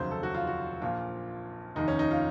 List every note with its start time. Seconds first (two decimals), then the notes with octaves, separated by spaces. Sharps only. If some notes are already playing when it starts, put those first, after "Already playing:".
Already playing: F1 D#2 C#3 F#3 C5
0.11 A4
0.23 F#4
0.34 F4
0.47 F#4
0.82 A#1 A#2 F3 F4
1.75 F1 D#2 D#3 D#4
1.88 C#4
1.99 D#4
2.11 F4